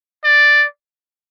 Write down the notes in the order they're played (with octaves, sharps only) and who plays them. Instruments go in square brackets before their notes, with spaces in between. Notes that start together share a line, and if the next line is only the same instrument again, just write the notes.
[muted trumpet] D5